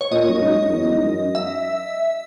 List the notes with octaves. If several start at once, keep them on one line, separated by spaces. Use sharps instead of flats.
C#5
A#2 D#5
F#2
G#2
F#2
E2
G#2
F#2
E5